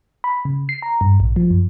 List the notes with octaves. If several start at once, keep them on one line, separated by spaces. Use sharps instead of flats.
B5
C#3
C7
A#5
G2
A#1
F3
F#2